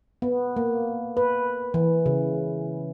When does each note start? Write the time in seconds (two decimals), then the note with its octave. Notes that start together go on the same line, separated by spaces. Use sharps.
0.22 B3
0.56 A#3
1.17 B4
1.74 E3
2.06 C#3